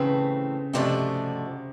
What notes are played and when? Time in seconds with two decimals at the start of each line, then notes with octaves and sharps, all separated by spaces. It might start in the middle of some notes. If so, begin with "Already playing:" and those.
Already playing: A2 C#3 E3 A3 C4
0.73 G#2 C3 F3 A3 D4 F#4